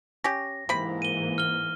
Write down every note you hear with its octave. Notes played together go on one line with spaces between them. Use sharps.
C#4 G4 A#6
G#2 C3 E3 A#3 B5
D#7 G7
F6 G7